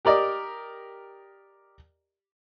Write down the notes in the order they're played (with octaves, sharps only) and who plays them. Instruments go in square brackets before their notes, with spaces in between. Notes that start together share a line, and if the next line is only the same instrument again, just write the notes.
[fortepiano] G4 A#4 D5 D#5